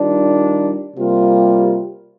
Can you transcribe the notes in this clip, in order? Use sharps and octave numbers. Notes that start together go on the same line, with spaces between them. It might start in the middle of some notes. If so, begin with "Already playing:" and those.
Already playing: D#3 G3 D4 F4
C3 G3 A#3 F4